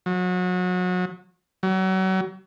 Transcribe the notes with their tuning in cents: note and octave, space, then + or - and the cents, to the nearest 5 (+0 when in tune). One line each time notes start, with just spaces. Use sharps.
F#3 -30
F#3 +35